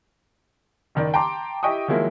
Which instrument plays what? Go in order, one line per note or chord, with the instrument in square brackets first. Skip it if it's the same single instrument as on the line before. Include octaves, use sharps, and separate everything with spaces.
[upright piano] F#1 D#3 D5
G5 A5 A#5 C6 D6
E4 G4 D#5 G5 C#6 D#6
D#3 F3 F#3 G#3 A#3 E4